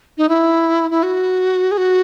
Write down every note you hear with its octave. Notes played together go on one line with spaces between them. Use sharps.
D#4
E4
E4
F#4
G#4
F#4